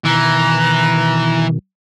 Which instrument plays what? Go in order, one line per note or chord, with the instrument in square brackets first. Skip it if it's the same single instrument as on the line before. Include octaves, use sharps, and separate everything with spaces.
[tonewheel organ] B2 D#3 [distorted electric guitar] E3 [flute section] A#5 F#6